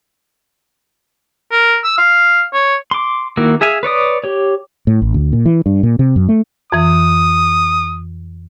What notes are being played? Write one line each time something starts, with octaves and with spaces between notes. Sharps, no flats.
A#4
E6
F5
C#5
C6 D6
D#3 A#3 E4 F#4
G#4 E5 F5 G#5
B4 C#5 D5 D#6
G4 C#5
A2
A1
D2
A#2
E3
G2
A#2
C3
F#2
A3
F2 E3 D#6